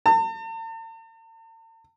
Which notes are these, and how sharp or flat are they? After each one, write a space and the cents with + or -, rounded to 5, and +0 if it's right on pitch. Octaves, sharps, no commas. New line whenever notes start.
A5 +45